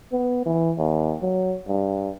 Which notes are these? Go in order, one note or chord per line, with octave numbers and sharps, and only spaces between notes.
B3
E3
D#2
F#3
G2